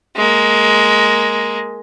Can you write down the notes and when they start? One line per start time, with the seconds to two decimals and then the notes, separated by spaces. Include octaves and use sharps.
0.16 G#3 A#3